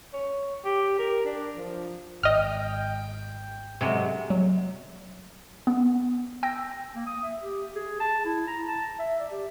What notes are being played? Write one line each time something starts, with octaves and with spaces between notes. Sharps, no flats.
C#5
G4
A#4
D4
F3
G#1 D#5 G5 F6
C3 F#3 G#3
F#3
B3
G5 E6 G6 A#6
A#3
D#6
E5
G4
G#4
A5
E4
A#5
A5
E5
D5
G4